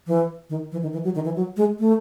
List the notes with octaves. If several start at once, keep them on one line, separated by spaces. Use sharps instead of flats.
E3
D#3
E3
D#3
E3
F#3
D#3
E3
F#3
G#3
A3